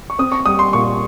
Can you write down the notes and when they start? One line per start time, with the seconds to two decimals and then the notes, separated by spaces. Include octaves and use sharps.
0.10 C#6
0.19 C4 D#6
0.32 C#6
0.46 G3 D#6
0.59 C6
0.73 A#2 C#6